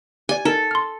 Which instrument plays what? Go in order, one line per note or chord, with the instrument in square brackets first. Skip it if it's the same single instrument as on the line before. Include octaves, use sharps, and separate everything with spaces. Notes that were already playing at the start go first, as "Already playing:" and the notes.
[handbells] G4 D5 [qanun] G#5
[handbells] D#4 A#4 [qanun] A4
[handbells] C6 F6